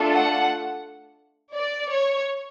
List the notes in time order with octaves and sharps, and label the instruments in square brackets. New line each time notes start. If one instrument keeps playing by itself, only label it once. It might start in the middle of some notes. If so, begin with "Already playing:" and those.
Already playing: [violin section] A3 D4 F4 A4
F#5
D5
C#5